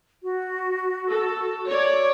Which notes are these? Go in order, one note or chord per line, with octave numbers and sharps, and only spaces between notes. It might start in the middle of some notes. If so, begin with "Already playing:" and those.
F#4
A4
C#5 D5